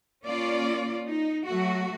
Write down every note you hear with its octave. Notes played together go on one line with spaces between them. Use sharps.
A#3 C#4 F4 D5
D#4
F#3 A3 F#4